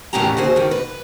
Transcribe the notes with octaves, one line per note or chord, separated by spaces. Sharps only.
E2 A2 D#3 C#4 G4 A#5
D#2 F#4 G#4 C5
G#2 D#3
B4